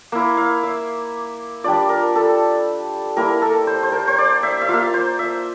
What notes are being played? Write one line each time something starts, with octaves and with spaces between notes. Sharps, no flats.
A#3 E4
F5
E5
G3 D4 F4 D5
A#4
A4
G3 A#3 E4 A#4
A4
C5
C5
A#4
C5
D5
E5
E5
A#3 F4 F5
C5
E5